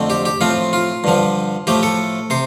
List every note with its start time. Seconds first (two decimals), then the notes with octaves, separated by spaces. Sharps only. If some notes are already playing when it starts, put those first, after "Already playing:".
Already playing: F2 D3 A3 C4
0.10 G4
0.25 G4
0.41 A2 F3 C4 F4
0.73 F4
1.04 G2 D3 F3
1.67 A2 F3 A3 G4
1.83 A4
2.30 C3 C5